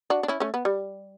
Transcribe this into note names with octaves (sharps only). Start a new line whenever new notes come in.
D4 F#4
D4
C#4 E4
A3 C#4
B3
G3